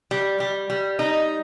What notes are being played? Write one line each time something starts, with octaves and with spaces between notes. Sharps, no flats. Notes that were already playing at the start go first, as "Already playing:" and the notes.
G3
G3
G3
D#4